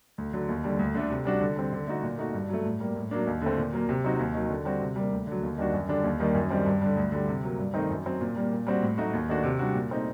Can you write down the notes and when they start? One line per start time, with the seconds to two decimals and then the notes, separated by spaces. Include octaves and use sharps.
0.18 D2
0.33 D3 F#3
0.49 D#2
0.64 D3 G3
0.79 D2
0.95 D3 A3 D4
1.10 C3
1.25 G3 D4 F#4
1.41 D3
1.56 G3 C4
1.73 D3
1.87 A3 D#4 F#4
2.03 A#2
2.18 A3 D#4 F#4
2.34 G2
2.49 F#3 A3
2.65 A2
2.80 G3 A#3
2.96 A2
3.11 F#3 A#3 D4
3.27 D#2
3.42 D3 A3 C4
3.57 A#2
3.73 F#3 A#3
3.89 C3
4.04 F#3 C4 D#4 F#4
4.19 D#2
4.34 D#3 F#3
4.50 D3
4.65 G3 C4 F#4
4.81 C3
4.96 G3 A#3
5.12 D2
5.27 D3 F#3
5.43 D#2
5.58 D#3 G3 D4 F#4
5.73 F#2
5.89 D3 G3 D4
6.04 D#2
6.20 D#3 G3 A#3 D#4
6.35 F#2
6.50 D#3 G3 C4
6.66 G2
6.82 D3 G3
6.97 D2
7.12 D3 G3
7.28 C3
7.43 F#3 A#3
7.58 G2
7.74 D#3 A3 C4 D#4
7.90 F#2
8.06 F#3 C4
8.21 A#2
8.36 G3 A#3
8.52 A#2
8.67 G3 C4 F#4
8.82 A2
8.98 F#3 A3 D#4 F#4
9.13 D#2
9.29 D#3 A3 D4 F#4
9.44 C3
9.59 G3 D4 F#4
9.75 A#2
9.91 A3 C4 D#4